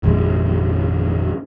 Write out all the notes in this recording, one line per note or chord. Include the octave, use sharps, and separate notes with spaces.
G#1 F2 A#2 G#3